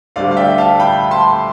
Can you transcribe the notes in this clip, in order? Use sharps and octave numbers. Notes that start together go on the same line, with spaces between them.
D2 D3 G3 D5 F5
F5
E5 G5
F5 A5
G5 B5
A5 C6